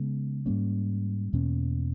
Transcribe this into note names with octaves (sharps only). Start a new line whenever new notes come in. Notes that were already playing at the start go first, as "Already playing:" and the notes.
Already playing: C#3 G#3 B3
G#2 G3 A#3 C#4
E2 B2 A#3 C#4